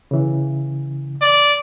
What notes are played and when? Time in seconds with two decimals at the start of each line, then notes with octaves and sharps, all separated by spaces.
0.11 C#3 E3
1.22 D5